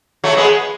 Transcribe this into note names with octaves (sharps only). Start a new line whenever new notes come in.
F#3 A3
G#3 B3